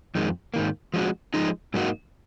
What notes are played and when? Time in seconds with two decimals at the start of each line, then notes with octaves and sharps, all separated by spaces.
0.15 F2 D#3 G#3
0.54 G#2 D#3 A#3
0.94 F3 G#3 C#4 F#4
1.34 F3 G#3 D#4
1.74 G#2 F#3 A#3 D#4 F#4